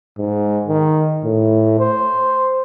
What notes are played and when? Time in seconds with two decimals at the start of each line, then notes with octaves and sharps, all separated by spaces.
0.19 G#2
0.68 D#3
1.24 A2
1.80 C5